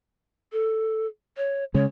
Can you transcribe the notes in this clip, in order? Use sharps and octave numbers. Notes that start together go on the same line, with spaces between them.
A4
C#5
C#3 G#3 C#5